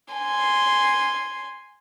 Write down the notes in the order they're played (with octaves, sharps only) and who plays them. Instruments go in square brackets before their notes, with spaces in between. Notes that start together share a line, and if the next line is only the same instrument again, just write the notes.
[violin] G#5 C6